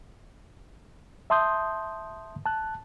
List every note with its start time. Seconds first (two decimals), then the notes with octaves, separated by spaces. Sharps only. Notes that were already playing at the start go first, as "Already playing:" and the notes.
1.30 E5 A5 C6 D#6 G6
2.46 A5 F#6